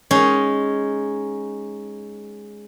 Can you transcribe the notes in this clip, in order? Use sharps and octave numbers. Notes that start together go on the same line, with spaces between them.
G#3 C#4 D#4